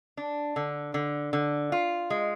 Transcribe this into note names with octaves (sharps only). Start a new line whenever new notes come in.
D4
D3
D3
D3
F4
G#3